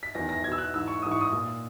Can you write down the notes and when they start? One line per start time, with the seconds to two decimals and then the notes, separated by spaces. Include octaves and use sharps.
0.03 B6
0.15 E2 D#3 A#6
0.29 A#6
0.43 E2 G#6
0.49 B2 E6
0.58 F#6
0.73 G#2 E3 E6
0.88 C#6
1.02 G#2 E3 D#6
1.11 C#6
1.21 D#6
1.32 A#2